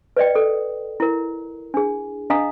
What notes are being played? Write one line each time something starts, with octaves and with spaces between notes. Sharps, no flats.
B4 D5 D#5 G5
A4
E4 A#4
D4 G#4
D4 D#5 F5 A#5 D#6